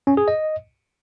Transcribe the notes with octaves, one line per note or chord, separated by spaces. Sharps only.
C#4
G#4
D#5